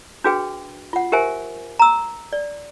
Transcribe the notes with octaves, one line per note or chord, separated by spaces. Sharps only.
D4 F#4 G#4 B4 G5
F4 F#5
G4 A#4 C5 E5 G#5
A#5 E6
D5